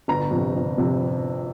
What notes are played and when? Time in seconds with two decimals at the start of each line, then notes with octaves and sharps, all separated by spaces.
0.08 G1 A#5
0.31 F2 C3
0.55 G1
0.78 F2 C3